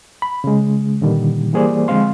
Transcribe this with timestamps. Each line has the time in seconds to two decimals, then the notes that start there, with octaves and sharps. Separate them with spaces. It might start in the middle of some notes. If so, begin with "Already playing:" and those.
0.22 B5
0.44 C#3 G#3
1.01 A#2 D3 D#3 G3
1.53 E3 G3 A#3 G#4 C5 D5
1.88 D3 F3 G#3 C4 F5 C6